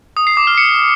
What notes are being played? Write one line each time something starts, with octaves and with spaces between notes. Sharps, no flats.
D#6
C7
D6
F6
C#7